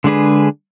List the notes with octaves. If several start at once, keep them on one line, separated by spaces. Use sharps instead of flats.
D3 G#3 D4 G#4 B4